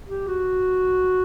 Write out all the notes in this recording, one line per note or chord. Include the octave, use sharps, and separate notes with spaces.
G4
F#4